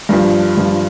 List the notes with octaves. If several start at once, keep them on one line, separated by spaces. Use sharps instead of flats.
G2 F3
G2 F3